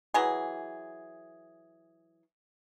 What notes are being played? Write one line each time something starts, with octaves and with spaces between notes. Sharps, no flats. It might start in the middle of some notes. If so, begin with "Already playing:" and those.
E3 F#3 G#4